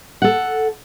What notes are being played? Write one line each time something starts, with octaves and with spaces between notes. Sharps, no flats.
A4 F#5